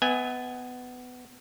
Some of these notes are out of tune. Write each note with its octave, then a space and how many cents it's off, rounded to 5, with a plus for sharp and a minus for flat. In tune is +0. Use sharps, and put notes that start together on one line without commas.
B3 +15 E5 -40 G#5 -15